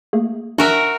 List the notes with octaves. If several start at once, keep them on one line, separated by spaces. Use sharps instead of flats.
A3 A#3 G#4
D4 F#4 A#4 E5 G#5